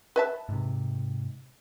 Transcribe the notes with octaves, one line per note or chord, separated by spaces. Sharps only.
B4 E5 A5
G#2 C3